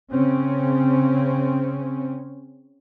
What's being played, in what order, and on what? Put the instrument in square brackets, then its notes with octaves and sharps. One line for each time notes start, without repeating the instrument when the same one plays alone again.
[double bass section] C#3 C4 C#4